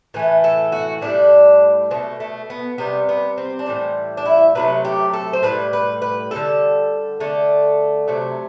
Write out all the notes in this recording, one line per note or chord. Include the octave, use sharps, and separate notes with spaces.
A2 E3 A3 B4
A4
F#4
A2 E3 G3 D4
B2 A3 C4
A3
B3
C3 G3 B3
B3
C4
D4
A2 E3 G3 C4
D4
E4
C3 F#3 A3 B4
G4
A4
C5
A2 G3 B4
B4
B4
D3 G3 A4
D3 A3
C3 F#3 A3